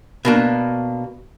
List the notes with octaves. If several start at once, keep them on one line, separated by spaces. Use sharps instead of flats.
B2 A#3 D4